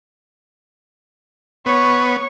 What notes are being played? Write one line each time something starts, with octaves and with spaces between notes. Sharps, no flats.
B3 C#5 C#6